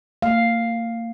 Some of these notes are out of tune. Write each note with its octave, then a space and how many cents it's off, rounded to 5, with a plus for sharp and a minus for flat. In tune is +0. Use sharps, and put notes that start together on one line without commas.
A#3 -35 F5 +0